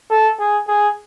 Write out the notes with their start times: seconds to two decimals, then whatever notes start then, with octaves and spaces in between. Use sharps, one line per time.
0.11 A4
0.39 G#4
0.68 G#4